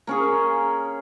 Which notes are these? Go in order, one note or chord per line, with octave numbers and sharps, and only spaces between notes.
A#3 C#4 G#4